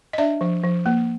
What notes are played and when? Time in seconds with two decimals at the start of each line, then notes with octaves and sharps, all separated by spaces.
0.13 D#5
0.18 D4 D5 E5
0.41 F3
0.63 F3
0.86 A#3